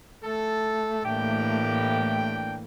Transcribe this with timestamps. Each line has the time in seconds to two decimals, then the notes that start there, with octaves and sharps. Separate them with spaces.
0.24 A3 A4
1.05 A2 E3 A#3 D4 G4 G5